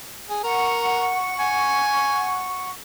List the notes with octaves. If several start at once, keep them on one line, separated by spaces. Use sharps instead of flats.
G#4
A#4 F#5 C#6
G#5